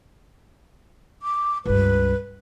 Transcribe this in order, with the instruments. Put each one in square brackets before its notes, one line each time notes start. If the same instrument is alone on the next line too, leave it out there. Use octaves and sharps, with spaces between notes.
[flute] D6
[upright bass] C#2 G2 [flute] B4